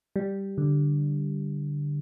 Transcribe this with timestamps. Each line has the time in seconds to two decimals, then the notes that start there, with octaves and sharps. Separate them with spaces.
0.16 G3
0.58 D3